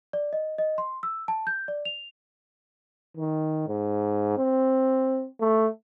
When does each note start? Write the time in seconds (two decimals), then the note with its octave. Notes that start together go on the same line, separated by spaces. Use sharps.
0.13 D5
0.33 D#5
0.58 D#5
0.78 C6
1.03 E6
1.28 A5
1.47 G6
1.68 D5
1.85 F7
3.17 D#3
3.68 G#2
4.37 C4
5.40 A3